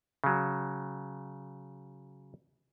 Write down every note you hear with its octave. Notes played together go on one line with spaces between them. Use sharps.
C#3 F#3